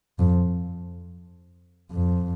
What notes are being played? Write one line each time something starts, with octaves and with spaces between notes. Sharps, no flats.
F2
F2